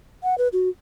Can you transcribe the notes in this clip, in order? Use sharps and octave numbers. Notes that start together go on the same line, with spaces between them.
F#5
B4
F#4